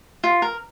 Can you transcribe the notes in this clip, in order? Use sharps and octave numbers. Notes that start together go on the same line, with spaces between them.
F4
A#4